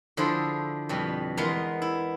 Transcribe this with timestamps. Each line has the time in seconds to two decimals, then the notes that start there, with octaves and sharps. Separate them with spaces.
0.17 D3 F3 E4 G#4 A4 C5
0.89 F2 B2 G3
1.37 E2 G#3 B3 A#4 A#5 C6
1.82 E4